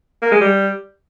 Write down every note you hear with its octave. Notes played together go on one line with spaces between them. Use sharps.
A#3
G#3
G3